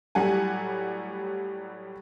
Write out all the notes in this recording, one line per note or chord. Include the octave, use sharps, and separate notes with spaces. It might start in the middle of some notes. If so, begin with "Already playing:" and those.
A2 F#3 G3 F#5 G#5